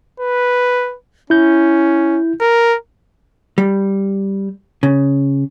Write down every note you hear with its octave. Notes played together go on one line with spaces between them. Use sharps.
B4
C#4 E4 G6
A#4
G3
C#3